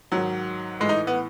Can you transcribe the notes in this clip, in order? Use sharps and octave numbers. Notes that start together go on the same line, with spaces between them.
G#2 D#3 F#3
A2 E3 G#3 D#4
B3